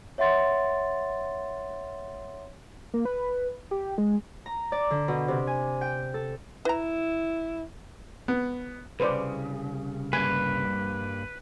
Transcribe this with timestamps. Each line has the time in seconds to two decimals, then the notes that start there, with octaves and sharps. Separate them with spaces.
0.18 C#5 E5 F#5 C6 A6
2.94 A#3
3.05 B4
3.71 G4
3.98 G#3
4.46 A#5
4.72 D5
4.91 D3
5.08 B2
5.28 C3
5.47 G#5
5.81 G5
6.14 A4
6.65 E4 B4 A#5
8.28 B3
9.00 C2 C#3 B4 C5 D5
10.13 G2 G3 A#3 B4 G#5